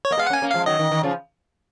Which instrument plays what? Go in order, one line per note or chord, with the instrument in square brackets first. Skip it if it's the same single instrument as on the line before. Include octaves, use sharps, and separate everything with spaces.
[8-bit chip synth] C#5
[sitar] A#3 [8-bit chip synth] D#5
[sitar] G#3 B3 [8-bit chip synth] F5
[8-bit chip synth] F#5
[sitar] A#3 C#4
[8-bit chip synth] G#5
[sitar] A#3 C#4
[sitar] F3 G#3 [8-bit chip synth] F5
[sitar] D#3 F#3 [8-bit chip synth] D#5
[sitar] D#3
D#3
C#3 F3